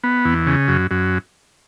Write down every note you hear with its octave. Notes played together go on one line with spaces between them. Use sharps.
B3
E2
C#3
F#2
F#2